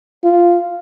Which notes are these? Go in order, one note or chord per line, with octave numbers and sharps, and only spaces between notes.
F4